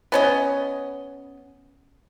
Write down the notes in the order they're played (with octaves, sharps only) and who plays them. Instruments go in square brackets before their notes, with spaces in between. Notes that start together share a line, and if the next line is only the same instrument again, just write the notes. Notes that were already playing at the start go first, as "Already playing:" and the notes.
[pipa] B3 C#4 D#5